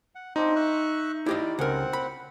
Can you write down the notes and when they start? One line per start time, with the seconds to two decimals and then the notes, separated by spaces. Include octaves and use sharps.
0.15 F#5
0.36 C4 D4 D#4 F4
0.56 E5 C#6 F#6
1.26 E4 G4 D5 D#5
1.59 C#2 C4 A#4 F#5
1.93 B5